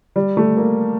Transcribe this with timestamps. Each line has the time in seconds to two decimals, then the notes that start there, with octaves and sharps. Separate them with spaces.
0.16 G3
0.37 A3
0.57 A#3